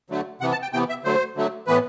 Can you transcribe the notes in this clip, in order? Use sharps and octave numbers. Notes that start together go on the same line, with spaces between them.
D3 F#3 A3
C3 E3 B3 F#5
A5
G5
C3 E3 B3 G5
E5
D3 F#3 A3 C5
D3 F#3 A3
A2 E3 B3 B4